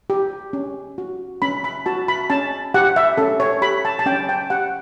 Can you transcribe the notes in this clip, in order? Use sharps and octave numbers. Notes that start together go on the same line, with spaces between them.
G4
C#4
F#4
C#4 B5
B5
F#4 A5
B5
C#4 A5
G4 F#5
E5
C#4 A4
C#5
G4 B5
A5
A5
C#4 G5
G5
G4 F#5